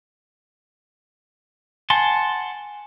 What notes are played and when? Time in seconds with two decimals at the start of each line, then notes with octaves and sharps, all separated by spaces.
1.90 F#5 G#5 A5 C6